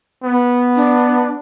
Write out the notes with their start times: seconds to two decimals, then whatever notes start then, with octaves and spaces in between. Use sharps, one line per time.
0.24 B3
0.76 D4